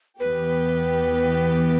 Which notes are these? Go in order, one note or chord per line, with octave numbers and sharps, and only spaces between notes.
E2 E3 B3 G4 B4